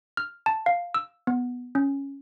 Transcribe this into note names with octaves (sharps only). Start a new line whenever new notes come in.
F6
A5
F5
E6
B3
C#4